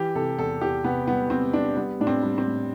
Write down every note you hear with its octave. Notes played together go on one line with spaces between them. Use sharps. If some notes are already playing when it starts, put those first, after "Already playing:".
Already playing: E3 G4
C3 A4
E2 A4
E2 G4
C3 B3
G3 B3
C3 C4
G3 D4
G3 B3
A2 D4
C4
G3
C4
A2